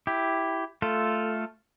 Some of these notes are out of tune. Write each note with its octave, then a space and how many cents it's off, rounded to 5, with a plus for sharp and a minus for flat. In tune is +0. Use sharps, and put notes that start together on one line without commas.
E4 +0 G4 +0
A3 +0 F4 +0 A4 +0